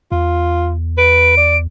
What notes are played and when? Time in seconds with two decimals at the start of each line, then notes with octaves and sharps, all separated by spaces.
0.12 E2 F4
0.98 B4 D7
1.37 D5